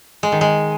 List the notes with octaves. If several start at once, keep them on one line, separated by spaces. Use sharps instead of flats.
G#3
D#3
G#3